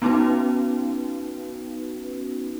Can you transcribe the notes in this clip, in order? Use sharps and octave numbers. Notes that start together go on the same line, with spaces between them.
B3 C#4 D#4 F#4 B4